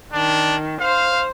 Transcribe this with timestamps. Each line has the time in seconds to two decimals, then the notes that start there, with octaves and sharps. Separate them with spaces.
0.13 D#3 D4
0.81 C5 F5